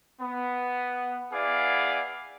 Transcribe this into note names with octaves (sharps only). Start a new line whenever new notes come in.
B3
B3 E4 G#4 D5 F5 D6